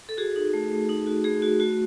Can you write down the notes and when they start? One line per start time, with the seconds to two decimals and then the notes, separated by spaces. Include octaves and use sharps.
0.09 A4
0.17 F#4 G#4
0.36 D#4
0.54 A3
0.71 A3
0.89 D#4
1.07 F#4
1.24 A3 G#4
1.42 F#4
1.60 A3 F#4